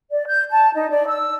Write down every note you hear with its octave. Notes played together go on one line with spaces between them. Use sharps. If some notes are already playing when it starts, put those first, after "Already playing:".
D5
G6
A5
D#4
D5
E6